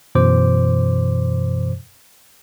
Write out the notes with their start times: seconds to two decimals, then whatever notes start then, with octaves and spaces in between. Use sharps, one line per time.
0.15 F#2 B2 E3 C5 D6